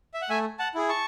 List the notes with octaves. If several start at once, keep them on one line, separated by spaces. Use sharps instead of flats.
E5
F#5
A3 E5 G#5
F#5 A5
E4 G#4
A5 C#6